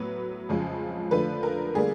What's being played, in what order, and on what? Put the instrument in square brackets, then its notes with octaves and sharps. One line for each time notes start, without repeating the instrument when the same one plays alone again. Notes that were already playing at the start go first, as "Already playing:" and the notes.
Already playing: [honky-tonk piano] A2 F#3 B3 B4
F2 C#3 F3 G#3
D3 F3 A3 B4
A#4
D3 G3 A#3 G#4